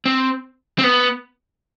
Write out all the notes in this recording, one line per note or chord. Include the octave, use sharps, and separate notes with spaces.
C4
C4
B3